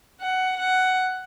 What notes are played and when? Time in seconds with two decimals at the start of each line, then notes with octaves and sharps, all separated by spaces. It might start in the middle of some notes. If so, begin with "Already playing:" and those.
0.20 F#5
0.57 F#5